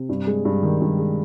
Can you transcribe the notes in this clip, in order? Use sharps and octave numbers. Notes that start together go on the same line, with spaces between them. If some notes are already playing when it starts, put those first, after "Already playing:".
Already playing: C3
G2
G#3
G2
D#3
G2
G#3